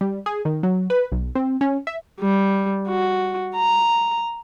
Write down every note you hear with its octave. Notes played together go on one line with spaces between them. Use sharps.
G3
G#4
D#3
F#3
B4
B1
C4
C#4
E5
G3
F#4
A#5